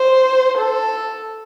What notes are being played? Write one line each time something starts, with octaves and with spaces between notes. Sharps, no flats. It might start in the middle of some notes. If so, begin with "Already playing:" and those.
Already playing: C5
A4